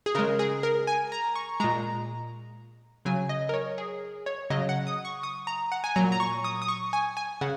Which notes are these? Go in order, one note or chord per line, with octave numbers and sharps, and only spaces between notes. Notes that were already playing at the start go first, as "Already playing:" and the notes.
G#4
C#3 G#3 A#4
G#4
A#4
G#5
A#5
C#6
A#2 G#3 A#5
C#3 F#3 G#5
D#5
A#4
C#5
G#4
C#5
C#3 F#3 D#5
F#5
D#6
C#6
D#6
A#5
F#5
G#5
A#2 F#3 A#5
A#5
C#6
D#6
D#6
C#6
G#5
G#5
C#3 F#5